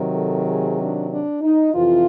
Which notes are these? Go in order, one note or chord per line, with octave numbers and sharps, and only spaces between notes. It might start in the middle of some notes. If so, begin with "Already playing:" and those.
Already playing: C3 D#3 F#3
A4
G#4
D4
D4
D#4
F2 C3 E3 F4